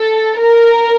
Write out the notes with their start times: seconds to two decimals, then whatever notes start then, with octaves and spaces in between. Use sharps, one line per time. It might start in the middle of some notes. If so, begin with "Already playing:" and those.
Already playing: A4
0.41 A#4